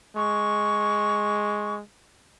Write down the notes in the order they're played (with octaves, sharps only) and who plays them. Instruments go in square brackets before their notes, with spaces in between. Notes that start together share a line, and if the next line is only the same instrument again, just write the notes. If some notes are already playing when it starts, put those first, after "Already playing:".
[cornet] G#3 [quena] C#6